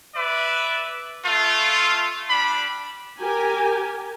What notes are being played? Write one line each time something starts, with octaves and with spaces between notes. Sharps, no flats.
B4 D5 E5
A3 F4
G3 D4 B5
G4 A#4 G#5